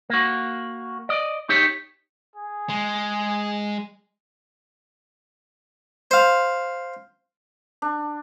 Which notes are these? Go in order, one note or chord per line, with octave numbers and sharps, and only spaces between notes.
A#3 F#4
D5 D#5
D#4 G4 C#5
G#4
G#3
C5 F5
D4